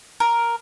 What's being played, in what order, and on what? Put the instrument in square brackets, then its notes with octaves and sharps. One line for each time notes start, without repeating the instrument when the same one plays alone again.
[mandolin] A#4